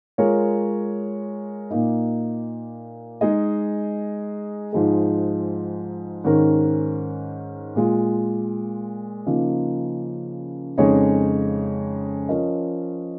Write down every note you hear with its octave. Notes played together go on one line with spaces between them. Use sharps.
G#3 F4 A#4 C#5
A#2 A#3 D#4
G#3 D#4 G#4 D#5
G#2 F3 G#3 D#4 G#4
G#2 D#3 C#4 A#4
A#2 G#3 F4
C#3 F3 A#3 D#4
F2 C#3 G#3 D#4 C#5
F3 C#4 A#4 D#5